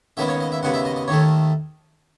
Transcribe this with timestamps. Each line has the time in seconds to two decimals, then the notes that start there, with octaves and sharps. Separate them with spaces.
0.17 D#2 C#3 G#3 B3 E5
0.29 C#5
0.40 D#5
0.52 E5
0.63 D#2 C#3 G#3 B3 F#5
0.74 E5
0.85 D#5
0.96 D#5
1.08 D#2 D#3 A3 C#5